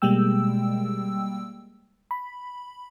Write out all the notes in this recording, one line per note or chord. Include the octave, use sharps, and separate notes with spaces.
B2 G3 G#3 A#3 G5 E6
B5